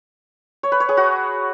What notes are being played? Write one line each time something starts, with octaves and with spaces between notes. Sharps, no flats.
C#5
B4
C#5
G#4
F#4